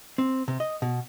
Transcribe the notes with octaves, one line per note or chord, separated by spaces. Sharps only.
C4
C3
D#5
B2